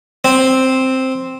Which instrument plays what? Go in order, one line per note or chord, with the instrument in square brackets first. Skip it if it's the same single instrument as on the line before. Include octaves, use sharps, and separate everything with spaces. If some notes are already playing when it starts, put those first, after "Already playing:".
[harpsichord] C4